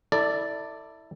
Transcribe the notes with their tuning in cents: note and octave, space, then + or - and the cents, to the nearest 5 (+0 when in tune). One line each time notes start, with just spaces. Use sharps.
E4 -20 A4 +25 D5 +0